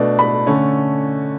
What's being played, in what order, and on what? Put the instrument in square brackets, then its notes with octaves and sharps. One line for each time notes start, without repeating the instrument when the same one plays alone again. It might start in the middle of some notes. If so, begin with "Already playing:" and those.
Already playing: [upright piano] B2 A3 D4
B5
D3 A3 C#4